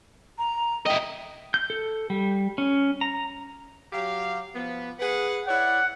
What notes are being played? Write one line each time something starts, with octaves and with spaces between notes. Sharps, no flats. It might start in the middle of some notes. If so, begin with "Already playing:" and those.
A#5
E4 D#5 G5
G6
A4
G3
C#4
A#5
F#3 G4 F5
F3 B3
G#4 B4 F#5
E4 C#5 D5 F#5